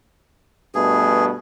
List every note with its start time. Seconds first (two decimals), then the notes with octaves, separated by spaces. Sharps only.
0.75 G2 B2 A3 G#4